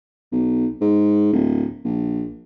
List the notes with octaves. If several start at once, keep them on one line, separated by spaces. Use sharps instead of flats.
B1
G#2
D1
A#1